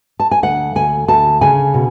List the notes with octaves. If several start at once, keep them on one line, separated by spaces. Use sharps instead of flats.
A5
G#5
D2 F#5
D2 G#5
D2 A5
C#3 G#5
B2